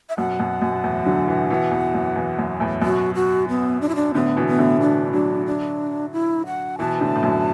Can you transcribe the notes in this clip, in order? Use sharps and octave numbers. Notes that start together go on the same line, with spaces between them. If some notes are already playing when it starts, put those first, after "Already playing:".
E5
F#2 B2 F#5
F#2 B2
F#2
B2
E2 A2
D3 F#3
B2 E3
B2 E3
E2
F#2
E2
F#2
E2 A2
F#2 B2 F#4
F#4
B3
D4
E4
D4
A2 D3 B3
B2 E3
B3
A2 D3
B2 E3 D4
D3 F#3 D4
D4
E4
F#5
B2 E3 A5
A2 D3
A2
F#2 B2